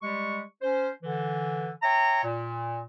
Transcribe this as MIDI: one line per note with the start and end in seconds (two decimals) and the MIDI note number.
0.02 0.41 55
0.02 0.41 56
0.02 0.41 67
0.02 0.41 85
0.62 0.89 61
0.62 0.89 72
1.03 1.70 50
1.03 1.70 52
1.82 2.23 73
1.82 2.23 76
1.82 2.23 79
1.82 2.23 82
2.24 2.81 46